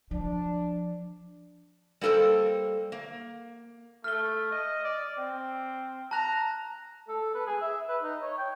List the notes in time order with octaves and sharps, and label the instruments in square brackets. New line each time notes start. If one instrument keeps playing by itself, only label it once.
[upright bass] F3 [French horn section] D4
[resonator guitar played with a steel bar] G3 A#3 A4 A#4 C5
A#3
[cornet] A3 [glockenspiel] F6 G7
[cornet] D#5
D5
C4
[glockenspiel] A5 F#6 [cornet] A#5
[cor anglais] A4
B4
G#4
E5
B4
D#4
C#5
G5